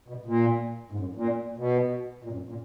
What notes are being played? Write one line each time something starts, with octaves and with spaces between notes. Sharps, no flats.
B2
A#2
G#2
F#2
A#2
B2
A#2
F#2
A#2